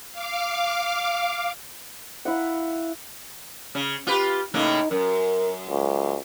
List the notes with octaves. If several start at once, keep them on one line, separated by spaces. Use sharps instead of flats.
F5 D6
E4 F5 F#5
C#3
F4 G4 B4
A2 C#3 A#3 D#4
F#2 A#4
C#2